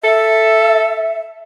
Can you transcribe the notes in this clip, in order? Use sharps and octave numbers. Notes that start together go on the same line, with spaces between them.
A4 E5